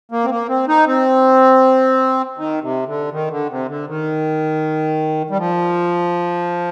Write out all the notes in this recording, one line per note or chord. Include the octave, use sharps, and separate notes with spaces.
A#3
C4
A#3
C4
D#4
C4
D#3
C3
D3
D#3
D3
C3
D3
D#3
G3
F3